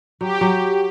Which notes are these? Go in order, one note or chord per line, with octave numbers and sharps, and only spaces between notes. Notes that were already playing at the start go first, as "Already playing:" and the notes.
F#3 G4
F#3